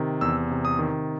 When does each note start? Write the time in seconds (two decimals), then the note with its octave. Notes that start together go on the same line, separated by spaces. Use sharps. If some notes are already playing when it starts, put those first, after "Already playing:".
Already playing: C3 D#3
0.21 E2 E6
0.51 C3
0.65 D#6
0.79 D#3